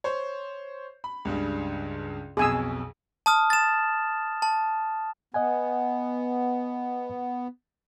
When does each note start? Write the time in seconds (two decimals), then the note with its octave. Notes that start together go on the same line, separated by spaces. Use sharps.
0.04 C5 C#5
1.04 B5
1.25 C#2 G2 C#3
2.37 B1 F2 B2 G#4 G#5 E6
3.26 A5 D#6 F6
3.50 A6 E7
4.42 A5
5.34 B3 D#5 F#5 G#5